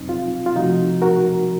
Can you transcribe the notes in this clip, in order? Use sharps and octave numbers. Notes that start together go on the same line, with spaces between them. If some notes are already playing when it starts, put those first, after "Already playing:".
Already playing: F2 C3 F#3 C4 D#4
F4
F4
C3 F3 A3 C4 D#4 F#4
F#4 A#4